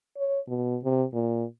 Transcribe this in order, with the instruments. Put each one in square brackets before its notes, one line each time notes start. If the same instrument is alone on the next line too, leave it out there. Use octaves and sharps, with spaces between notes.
[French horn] C#5
B2
C3
A#2